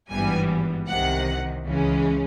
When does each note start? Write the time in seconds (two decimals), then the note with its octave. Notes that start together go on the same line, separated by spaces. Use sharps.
0.10 G#1 G2 E3 G3 B3 G#5
0.88 C2 C3 D#3 F#5
1.64 C#2 C#3 E3 G#3 C#4